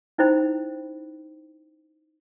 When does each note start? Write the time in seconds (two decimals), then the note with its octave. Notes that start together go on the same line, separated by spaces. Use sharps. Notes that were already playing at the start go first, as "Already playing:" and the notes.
0.18 C#4 D#4 E4 C5 G5 B5